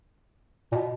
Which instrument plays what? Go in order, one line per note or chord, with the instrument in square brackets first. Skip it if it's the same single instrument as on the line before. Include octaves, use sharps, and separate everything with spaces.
[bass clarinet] A#2
B2